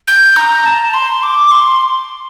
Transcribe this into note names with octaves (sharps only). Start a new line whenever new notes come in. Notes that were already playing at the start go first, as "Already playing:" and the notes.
G6
A#5
A5
C6
D6
C6